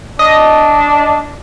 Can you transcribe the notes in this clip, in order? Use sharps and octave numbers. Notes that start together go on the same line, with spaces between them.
D4 D#5